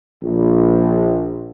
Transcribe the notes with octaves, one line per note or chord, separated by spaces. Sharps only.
A#1